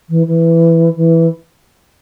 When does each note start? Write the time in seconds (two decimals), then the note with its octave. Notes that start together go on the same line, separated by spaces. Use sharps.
0.09 E3
0.27 E3
0.96 E3